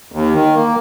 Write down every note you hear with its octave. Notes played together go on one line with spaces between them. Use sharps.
D#2
D#3
A#3